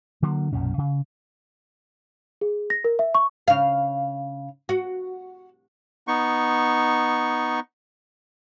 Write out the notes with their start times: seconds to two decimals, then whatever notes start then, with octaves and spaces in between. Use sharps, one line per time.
0.22 D3 F#3 A#3
0.53 B1 F#2 A#2 C#4
0.78 C#3
2.41 G#4
2.70 A#6
2.85 A#4
2.99 E5
3.15 C#6
3.48 C#3 F5
4.69 F#4
6.08 B3 D#4 C#6